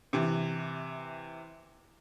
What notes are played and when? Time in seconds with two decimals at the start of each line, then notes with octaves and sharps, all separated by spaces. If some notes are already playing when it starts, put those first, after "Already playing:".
0.13 C3 E3